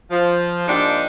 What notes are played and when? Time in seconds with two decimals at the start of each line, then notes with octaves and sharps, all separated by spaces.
0.11 F3
0.67 G#2 F3 A#3 D4 D#4 G4